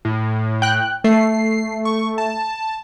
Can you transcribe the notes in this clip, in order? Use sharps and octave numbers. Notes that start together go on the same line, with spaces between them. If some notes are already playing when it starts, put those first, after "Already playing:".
A2
G5 F#6
A3 C7
C#6
A5